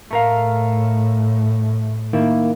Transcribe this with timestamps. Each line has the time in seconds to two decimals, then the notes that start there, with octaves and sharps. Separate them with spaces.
0.11 A2 A3 A#4 F5
2.13 D#3 A#3 E4